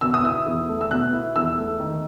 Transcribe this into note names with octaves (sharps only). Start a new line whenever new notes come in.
B2 E6
D#6
E4 E6
E2
A3
E6
B2 F#6
E4
E2 E6
A3
D#3